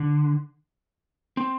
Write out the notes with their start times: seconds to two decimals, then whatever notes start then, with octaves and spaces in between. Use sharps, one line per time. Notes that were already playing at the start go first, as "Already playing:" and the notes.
Already playing: D3
1.37 C4